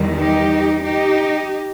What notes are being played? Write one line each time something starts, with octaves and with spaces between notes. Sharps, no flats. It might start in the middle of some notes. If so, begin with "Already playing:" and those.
Already playing: E2 D#3 G3
D#4 G4
D#4 G4